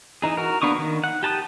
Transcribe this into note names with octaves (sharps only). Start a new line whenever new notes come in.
E3 D#4 G#4
F#4 A#4
A#3 B3 D4 C#6 D#6
D#3
F#5
G4 A5 A#5 D#6